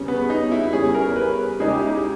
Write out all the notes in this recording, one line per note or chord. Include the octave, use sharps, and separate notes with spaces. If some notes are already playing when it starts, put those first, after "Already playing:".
Already playing: E2 C#3 G3 C#4
B3
D#4
E4
E2 C#3 G3 C#4 G#4
A#4
B4
C#3 G#3 D#4 G#4
G4
E4
G4